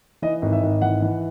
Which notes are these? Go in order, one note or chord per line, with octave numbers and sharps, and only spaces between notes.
E3 D#5
G#1
E5
G#1
E3 F#5
E3